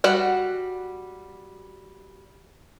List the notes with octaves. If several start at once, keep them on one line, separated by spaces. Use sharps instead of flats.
G3 F#4 F#5